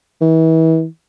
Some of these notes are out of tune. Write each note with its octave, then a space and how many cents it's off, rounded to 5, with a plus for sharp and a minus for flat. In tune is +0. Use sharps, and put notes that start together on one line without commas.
E3 -35